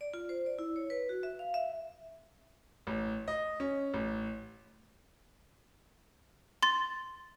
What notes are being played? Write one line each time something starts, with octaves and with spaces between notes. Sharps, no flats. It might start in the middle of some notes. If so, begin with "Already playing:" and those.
D5
F4
C5
D5
E4
C#5
B4
F#4
E5
F5
E5
A1
D#5
C#4
A1
C6 A6